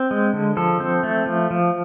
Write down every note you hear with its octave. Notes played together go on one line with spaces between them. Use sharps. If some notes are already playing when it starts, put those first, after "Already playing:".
Already playing: C4
G#3
D3
F3 A4
C4
A3
F3
F3